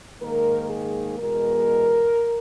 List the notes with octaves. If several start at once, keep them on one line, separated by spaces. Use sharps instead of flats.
G#2 D#3 A#3 A#4
G#4
E2 B2 G#3 A#4